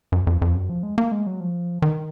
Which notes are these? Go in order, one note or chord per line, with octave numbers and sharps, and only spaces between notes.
F#2
F2
F2
F#2
F3
G#3
A#3
G#3
F#3
F3
D#3